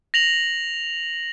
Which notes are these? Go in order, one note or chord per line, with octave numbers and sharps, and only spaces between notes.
A#6 F7 F#7